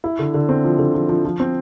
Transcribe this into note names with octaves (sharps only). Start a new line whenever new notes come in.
E4
D3
D3
C4
F3
D3
F3
F3
F3
C4